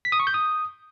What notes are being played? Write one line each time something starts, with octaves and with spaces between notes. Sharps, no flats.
B6
D#6
C#6
G6
D#6